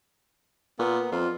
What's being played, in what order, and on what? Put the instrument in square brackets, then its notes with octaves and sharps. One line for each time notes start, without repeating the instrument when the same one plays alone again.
[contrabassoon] A#2 [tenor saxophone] B3
[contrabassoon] F2 [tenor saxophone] F4